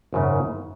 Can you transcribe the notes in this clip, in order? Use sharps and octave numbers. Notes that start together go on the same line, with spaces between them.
G#1 F#2 C#3